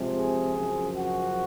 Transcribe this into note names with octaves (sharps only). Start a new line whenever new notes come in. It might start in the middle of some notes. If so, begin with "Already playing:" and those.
Already playing: F2 C3 F3 G#3
G#4
F#2 C#3 F3
F#4